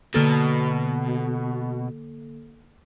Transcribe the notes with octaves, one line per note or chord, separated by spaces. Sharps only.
B2 D3 A#3 A4